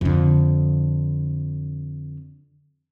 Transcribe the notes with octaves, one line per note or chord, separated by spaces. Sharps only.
F2 D3